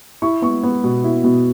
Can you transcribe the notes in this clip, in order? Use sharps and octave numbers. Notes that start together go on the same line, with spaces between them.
E4 C#6
B3 C#6
B3
B2
E4
B2